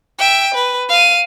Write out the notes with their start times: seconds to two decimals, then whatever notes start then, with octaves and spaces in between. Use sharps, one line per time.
0.19 E5 G5
0.54 B4
0.89 F5 D#7